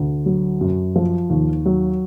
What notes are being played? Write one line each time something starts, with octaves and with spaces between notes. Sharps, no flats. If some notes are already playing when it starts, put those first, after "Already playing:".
Already playing: D2
F#3
F#2
F3
D#2
F#3